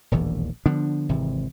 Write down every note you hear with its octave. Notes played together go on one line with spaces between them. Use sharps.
E1 A#1 D#2 E3
D3 F3 B3 D4
G#1 C3 E3